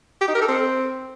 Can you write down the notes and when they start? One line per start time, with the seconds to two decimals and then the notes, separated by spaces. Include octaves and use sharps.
0.21 G4
0.28 D#4
0.35 A#4
0.42 A4
0.48 C4